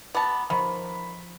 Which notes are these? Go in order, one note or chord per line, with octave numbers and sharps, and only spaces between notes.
B3 A5 A#5 D6
D#3 F3 B5